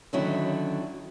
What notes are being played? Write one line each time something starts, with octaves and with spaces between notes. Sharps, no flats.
D3 D#3 F#3 C#4 E4